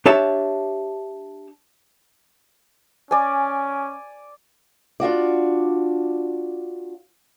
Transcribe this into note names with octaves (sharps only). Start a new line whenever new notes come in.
D4 G4 C#5 E5 A5
C#4 D5 G#5
D4 F4 F#4 D5